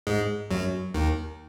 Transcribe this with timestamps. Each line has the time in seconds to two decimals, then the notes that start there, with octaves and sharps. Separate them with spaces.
0.07 G#2 G#3
0.51 F#2 F#3
0.94 D#2 D#3